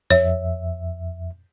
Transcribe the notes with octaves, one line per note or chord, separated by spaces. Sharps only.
F2 C#5 E5